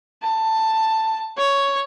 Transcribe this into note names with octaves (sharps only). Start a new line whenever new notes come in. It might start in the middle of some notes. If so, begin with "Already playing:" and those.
A5
C#5